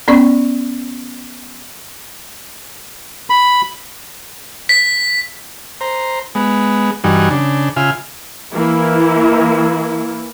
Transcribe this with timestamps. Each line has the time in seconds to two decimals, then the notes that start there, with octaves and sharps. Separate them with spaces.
0.08 B3 C#4 D5 C#6
3.30 B5
4.69 B6
5.81 C5 A#5
6.35 G#3 B3
7.04 G2 E3 G3 D#4 F#4 G#5
7.30 C#3 D4
7.76 C#3 F4 E5 G#5 F6
8.53 E3 A#3 E4